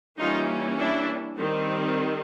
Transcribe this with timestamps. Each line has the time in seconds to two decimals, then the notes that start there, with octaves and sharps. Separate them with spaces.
0.18 E3 G3 A#3 C#4 D#4 F4
0.77 D4 E4
1.36 D#3 G3 C4